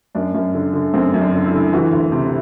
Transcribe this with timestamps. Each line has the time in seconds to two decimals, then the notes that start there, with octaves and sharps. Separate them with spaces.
0.15 F#2 D4
0.34 F#2
0.55 D3
0.73 D3
0.94 F#2 C4
1.14 F#2
1.20 D4
1.34 D3
1.46 E4
1.53 D3
1.73 E3 F#4
1.93 D2
2.12 C3
2.26 E4